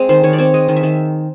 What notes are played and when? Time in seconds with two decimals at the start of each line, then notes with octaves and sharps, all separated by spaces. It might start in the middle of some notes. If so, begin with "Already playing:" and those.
Already playing: G#3 C4
0.09 D#3 C5
0.23 D#3 C#5
0.33 D5
0.38 C4 C#5
0.54 G#3 D#5
0.68 D#3
0.76 E5
0.83 D#3